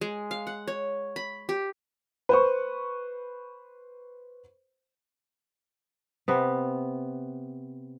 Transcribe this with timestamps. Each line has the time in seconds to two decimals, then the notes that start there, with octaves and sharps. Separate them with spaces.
0.01 G#3
0.31 F5
0.47 F#5
0.68 C#5
1.16 B5
1.49 G4
2.29 B4 C5 C#6
6.28 C3 B3